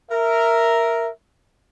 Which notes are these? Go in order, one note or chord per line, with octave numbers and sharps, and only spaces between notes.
A#4 E5